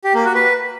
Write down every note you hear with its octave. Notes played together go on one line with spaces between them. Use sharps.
G4
A#3
F#4
B4